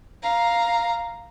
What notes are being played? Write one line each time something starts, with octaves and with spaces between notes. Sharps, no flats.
F5 A#5